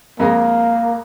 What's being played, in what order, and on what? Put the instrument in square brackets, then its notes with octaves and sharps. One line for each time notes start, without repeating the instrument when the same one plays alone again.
[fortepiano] F2 G#3 A#4 [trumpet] A#3